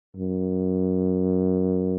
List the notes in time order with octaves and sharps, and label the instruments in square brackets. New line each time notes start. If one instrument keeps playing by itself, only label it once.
[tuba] F#2